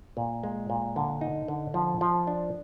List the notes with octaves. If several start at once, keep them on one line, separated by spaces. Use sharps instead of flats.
A#2
G#3
A#2
D3
D#4
D3
F3
F3
D4